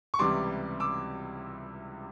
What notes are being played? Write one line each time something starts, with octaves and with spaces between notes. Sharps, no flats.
C#6
C#2 C3 E3 G3 C6 D6
D6 E6